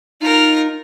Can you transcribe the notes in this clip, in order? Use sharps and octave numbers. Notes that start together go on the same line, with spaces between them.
D#4 F4 A#4